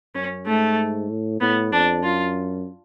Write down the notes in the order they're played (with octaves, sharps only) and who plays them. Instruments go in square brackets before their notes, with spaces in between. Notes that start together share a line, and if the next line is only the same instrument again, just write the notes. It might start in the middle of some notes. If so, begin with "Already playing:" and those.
[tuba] F#2 [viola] C#4
[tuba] G#2 [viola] A3
[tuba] A2
[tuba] A2 [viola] B3
[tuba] F2 [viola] D4
[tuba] F#2 [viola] F4